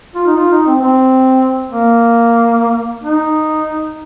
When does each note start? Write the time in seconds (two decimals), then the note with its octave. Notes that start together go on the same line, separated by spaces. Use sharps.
0.14 F4
0.26 D#4
0.36 F4
0.51 D#4
0.67 C4
0.81 C4
1.70 A#3
3.04 D#4